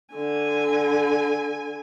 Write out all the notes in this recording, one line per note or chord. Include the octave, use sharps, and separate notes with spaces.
D3 G#5